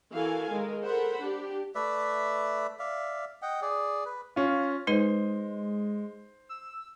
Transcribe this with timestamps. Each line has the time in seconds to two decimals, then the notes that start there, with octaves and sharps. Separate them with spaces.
0.14 E3 F#4 A4 A#4 F5 G#5
0.51 D#3 G#3 A#4
0.84 A4 A#4 C5 F#5 B5
1.22 D4 G4
1.75 A3 B4 D5 E5
2.79 D5 E5 F5
3.42 D#5 F#5 G5
3.62 G#4 D5
4.05 B4
4.36 C#4 F4 F5
4.87 G#3 D#4 B4 C5 D#5 D#7
6.49 E6